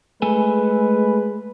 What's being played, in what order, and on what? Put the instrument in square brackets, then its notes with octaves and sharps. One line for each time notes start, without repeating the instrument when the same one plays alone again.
[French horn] G#3 [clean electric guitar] A3 A4 G#5 [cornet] B4